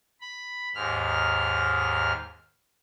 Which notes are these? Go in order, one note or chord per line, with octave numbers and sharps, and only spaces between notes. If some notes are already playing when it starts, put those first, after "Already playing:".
B5
D#2 G#2 F6